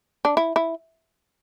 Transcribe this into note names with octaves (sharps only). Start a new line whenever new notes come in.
D4
E4
E4